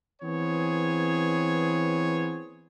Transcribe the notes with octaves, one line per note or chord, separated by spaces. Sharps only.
E3 B3 C4 G#4 C#5